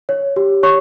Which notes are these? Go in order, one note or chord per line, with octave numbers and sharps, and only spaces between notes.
C#5
G4
C#5 C#6